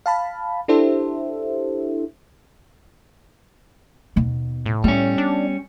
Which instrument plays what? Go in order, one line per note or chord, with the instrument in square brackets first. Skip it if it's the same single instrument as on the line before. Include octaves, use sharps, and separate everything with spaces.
[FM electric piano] F5 A5 B5
D4 E4 G4 A4 C5 E5
[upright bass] D#2 B2
[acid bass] A2
[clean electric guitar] G3 C#4 [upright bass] B3
[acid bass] D4